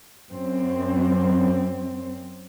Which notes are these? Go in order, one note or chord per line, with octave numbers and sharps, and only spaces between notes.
F#2 C4